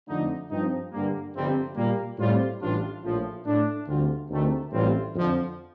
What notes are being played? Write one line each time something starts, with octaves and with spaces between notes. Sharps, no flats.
F2 D3 A3 D#4
G2 F3 C4 D#4
G2 D3 G3 A#3
G1 F2 C3 G3 C4
A#2 G3 A#3
A2 G3 C4 F4
A1 A2 G3 D4 F4
A#1 A2 F3
A2 A3 D4
D2 D3 G3 C4 F4
D2 C3 D#3 A3
A1 A2 G3 C4 F4
F2 D3 F3